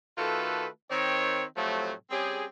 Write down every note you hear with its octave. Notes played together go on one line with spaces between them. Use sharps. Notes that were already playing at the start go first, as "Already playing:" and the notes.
D#3 A3 F4 F#4 A4 B4
D#3 C4 C#5
A2 C3 F3 F#3 A3
G3 C4 C#4 G4 G#4